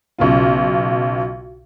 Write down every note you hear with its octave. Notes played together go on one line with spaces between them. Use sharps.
B1 C#3 F4